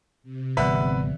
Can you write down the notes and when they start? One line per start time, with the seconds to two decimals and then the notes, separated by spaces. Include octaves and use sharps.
0.23 C3
0.57 G#1 D3 E3 G3 B3 B4 E5 F#5